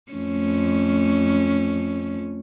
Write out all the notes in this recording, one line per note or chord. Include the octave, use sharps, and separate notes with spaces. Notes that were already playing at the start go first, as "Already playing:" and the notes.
F2 A3 C#4